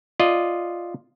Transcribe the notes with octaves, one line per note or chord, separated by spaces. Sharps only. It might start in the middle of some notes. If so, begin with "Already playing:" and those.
F4 D5 D#5